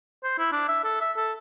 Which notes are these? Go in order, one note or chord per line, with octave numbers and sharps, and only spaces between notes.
C5
E4
D4
E5
A4
E5
A4